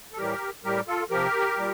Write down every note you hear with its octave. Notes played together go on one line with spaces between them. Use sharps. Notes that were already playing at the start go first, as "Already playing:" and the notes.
A4
A2 E3 G3 G4 A#4
A2 G3 G4 A#4
F4 A4
C3 F3 G4 A#4
A#2 G3